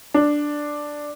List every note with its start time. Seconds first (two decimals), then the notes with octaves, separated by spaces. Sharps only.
0.14 D4